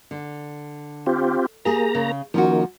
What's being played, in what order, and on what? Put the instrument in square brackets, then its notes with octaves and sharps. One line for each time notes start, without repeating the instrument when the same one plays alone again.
[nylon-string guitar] D3
[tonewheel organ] C4 F4 G4
[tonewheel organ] A#3 A#5 [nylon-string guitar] G4 G#4
[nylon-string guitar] C#3
[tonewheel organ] D#3 A#3 [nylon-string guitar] F3 C#4 F#4